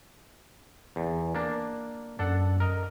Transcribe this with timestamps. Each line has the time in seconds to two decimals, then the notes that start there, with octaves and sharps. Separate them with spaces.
0.96 E2
1.35 A#3 D4
2.19 F#2 D4 A4 F#5
2.60 A#4 D#5